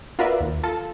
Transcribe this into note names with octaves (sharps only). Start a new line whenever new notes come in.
F4 F#4 A#4 B4 D5 E5
D#2
F4 A4 A5